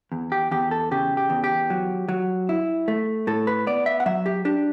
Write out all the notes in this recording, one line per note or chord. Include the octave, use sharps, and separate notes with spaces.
E2
G4
E2 G4
A4
C#3 G4
G4
E2
G4
F#3
F#3
E4
A3
A2 A4
B4
B3 D5
E5
F#5
F#3 E5
G4
D4 G4